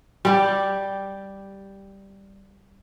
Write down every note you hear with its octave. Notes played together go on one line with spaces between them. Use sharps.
G3 G4